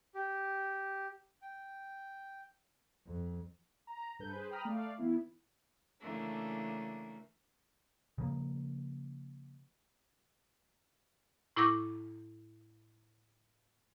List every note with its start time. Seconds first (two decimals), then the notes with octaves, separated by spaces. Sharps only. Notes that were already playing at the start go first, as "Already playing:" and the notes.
0.15 G4
1.42 G5
3.07 F2
3.87 A#5
4.19 G2 A4 B4 G6
4.33 G#4 B4 C5
4.51 G5 A#5 B5 D#6 F6
4.65 A3 D5 F5
4.98 E3 B3 E4
6.01 C#3 E3 A3 A#3 D4
8.18 C#3 F3 A#3
11.56 A2 E4 C#6 D6 E6 A#6